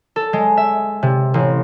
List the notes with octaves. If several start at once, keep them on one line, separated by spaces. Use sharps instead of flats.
A4
G#3
E5
C3
A1